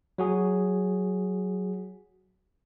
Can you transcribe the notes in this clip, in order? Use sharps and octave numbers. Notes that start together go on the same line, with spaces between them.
F#3 F#4 G#4